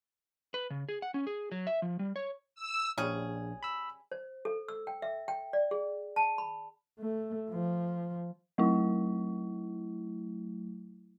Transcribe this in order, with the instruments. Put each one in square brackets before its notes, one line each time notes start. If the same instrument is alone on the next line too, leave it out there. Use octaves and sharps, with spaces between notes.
[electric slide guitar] B4
C#3
G#4
F#5
C#4
G#4
F#3
E5
F3
G3
C#5
[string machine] E6
[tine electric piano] A#1 [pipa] G3 C#4 G#4
[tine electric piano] B5 E6
[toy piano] C5
A4
E6
G5
E5
G5
D5
G#4
A5
B5
[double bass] A3
F3
[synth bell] F#3 A3 E4